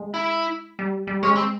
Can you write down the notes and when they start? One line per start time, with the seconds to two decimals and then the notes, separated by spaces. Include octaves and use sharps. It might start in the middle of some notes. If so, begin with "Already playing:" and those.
Already playing: G#3
0.14 E4
0.79 G3
1.07 G3
1.23 G#3 C#4
1.36 C4